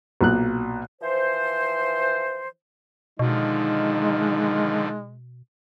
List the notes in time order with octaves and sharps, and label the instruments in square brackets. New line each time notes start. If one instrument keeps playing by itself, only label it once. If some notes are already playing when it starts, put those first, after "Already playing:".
[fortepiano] B1 A#2 F#6
[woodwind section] E3 F3 C5
[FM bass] B2 [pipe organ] D3 D#3 F3 [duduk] G#3 [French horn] D#4